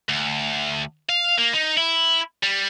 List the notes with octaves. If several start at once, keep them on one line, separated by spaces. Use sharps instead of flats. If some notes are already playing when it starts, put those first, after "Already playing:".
D2
F5
A#3
D#4
E4
G3